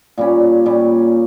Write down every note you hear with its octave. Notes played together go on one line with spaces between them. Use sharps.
A#2 G3 C#4
A#2 G3 C#4